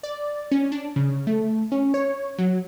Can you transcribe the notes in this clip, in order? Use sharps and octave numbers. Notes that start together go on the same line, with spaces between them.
D5
C#4
D4
C#3
A3
C#4
C#5
F#3